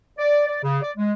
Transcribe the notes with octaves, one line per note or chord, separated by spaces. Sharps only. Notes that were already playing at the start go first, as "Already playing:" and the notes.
D5
D5
C#3
D5
G#3